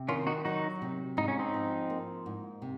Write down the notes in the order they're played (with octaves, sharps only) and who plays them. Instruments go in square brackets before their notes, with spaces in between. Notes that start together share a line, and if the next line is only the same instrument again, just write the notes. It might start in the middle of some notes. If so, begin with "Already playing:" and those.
Already playing: [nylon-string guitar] C3
[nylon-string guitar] D#3 [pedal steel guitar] C#4 F4
[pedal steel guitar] D#4 F#4
[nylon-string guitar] F#3 [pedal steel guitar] D#4 F#4
[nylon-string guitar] C3
[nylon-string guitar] G#2 [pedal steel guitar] D#4
[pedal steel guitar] C#4
C4 D#4
[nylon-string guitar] F3
A#3
G#2
C3